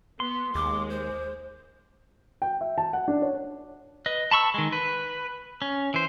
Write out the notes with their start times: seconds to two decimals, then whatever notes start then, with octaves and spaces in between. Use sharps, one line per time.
0.20 B3 C6
0.55 D#2 G#3 D6
0.90 C5
2.42 G5
2.61 E5
2.78 A5
2.93 F#5
3.08 D4
3.22 C#5
4.06 B4 D#5
4.31 A5 B5 C#6 E6
4.54 D#3 G#3
4.72 B4
5.62 C#4
5.94 E3 C5